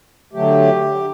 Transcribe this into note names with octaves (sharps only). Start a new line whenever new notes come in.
D3 F#3 A3 G4